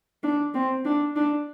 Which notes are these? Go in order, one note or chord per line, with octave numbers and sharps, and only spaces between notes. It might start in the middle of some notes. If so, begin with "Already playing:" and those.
D4
C4
D4
D4